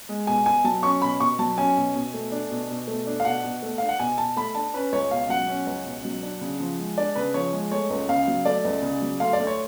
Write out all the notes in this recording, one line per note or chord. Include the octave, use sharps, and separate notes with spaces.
G#3
B2 G#5
B2 G#5
F#3 A5
C#4 C#6
B2 B5
B2 C#6
F#3 A5
C#4 G#5
B2
B2
A3
D4
B2
B2
A3
D4
F5
B2 F#5
B2
A3
D4 F5
F#5
B2 G#5
B2 A5
A3 B5
D4 A5
C#4 B4
C#2 C#5
B2 F5
F#3 F#5
C#4
C#2
B2
F#3
D4
C#3
F3
G#3
D4 D5
C#3 B4
F3 C#5
G#3
A3 C#5
C#2
C#3 F5
F#3
A3 D5
C#2
C#3
F#3
D2 F5
D5
D2
C#5